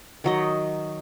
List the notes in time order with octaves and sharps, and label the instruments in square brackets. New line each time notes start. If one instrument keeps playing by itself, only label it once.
[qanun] D#3 F#3 D#5